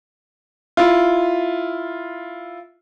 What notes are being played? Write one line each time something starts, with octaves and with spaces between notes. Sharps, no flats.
E4 F4